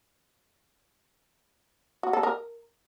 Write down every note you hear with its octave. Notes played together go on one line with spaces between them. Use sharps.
F#4
A4
A#4